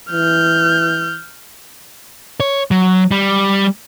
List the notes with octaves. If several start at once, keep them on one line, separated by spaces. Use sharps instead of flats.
E3 F6 G6
C#5
F#3
G3